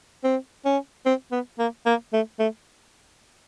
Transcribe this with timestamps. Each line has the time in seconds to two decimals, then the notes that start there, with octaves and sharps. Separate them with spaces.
0.24 C4
0.65 C#4
1.06 C4
1.32 B3
1.59 A#3
1.86 A#3
2.13 A3
2.39 A3